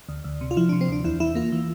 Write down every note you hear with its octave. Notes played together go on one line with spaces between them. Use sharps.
D2
D2
C3
F4
F3 E4
D4
C3
C4
D2 D4
E2 E4
E3 E4
A#3 F4
E3